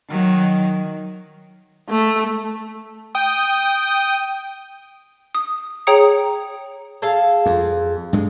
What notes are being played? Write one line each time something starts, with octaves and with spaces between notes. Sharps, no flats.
D#3 F#3
A3
G5 D#6
D#6
G#4 C#5 G5 A#5 D#6 C#7
G#4 A4 F5
F2
G2 G#3